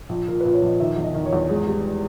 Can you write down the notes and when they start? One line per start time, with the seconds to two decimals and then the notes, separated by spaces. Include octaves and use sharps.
0.09 A#1
0.27 A#2 A#4
0.41 A#2 B4
0.53 C#5
0.62 A#1 D#5
0.80 D#3 E5
0.96 E2
1.03 D#5
1.14 D#3
1.26 C#5
1.33 E2
1.49 G#2 G#4
1.68 G3